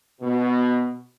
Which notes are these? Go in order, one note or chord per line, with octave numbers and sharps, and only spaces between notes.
B2